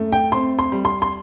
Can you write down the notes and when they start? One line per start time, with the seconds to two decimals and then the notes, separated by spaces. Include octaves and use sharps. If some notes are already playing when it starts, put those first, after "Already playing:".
Already playing: F#2 A3
0.12 G5
0.32 C4 C6
0.59 C6
0.72 G3
0.85 C6
1.02 C6